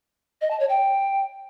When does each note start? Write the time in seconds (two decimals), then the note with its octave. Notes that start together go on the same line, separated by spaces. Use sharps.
0.41 D#5
0.51 A5
0.60 C#5
0.69 G5